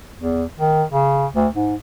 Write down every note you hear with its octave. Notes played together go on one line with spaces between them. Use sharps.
E2
D#3
C#3
D2
G#2